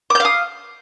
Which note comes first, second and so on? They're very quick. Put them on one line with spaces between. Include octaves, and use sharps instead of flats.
D6 G6 F5 D#6